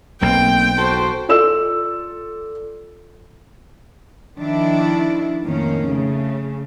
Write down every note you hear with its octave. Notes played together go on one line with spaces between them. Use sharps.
B1 A#3 C4 G5
F#4 A4 C5
F4 A4 D5 E6 E7
D#3 F3 D4 E4
F2 A2 D#3 A#3 C#4
C#3 A3